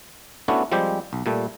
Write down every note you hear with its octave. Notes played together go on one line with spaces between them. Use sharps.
A3 B3 C#4 D4 E4 F#4
F3 G3 G#3 C4 G4 C5
B1
A#2 G3 A3